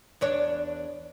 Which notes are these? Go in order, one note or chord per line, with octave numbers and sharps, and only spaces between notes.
E2 D4 C#5